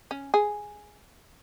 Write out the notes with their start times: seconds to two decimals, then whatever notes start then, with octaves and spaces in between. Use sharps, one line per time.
0.11 C#4
0.34 G#4